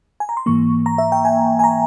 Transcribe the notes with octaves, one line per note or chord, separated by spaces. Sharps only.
G#5
A#5
C6
G#2 E3 A#3 C#6
A#5
E5
G5
G#5
G#5
A#5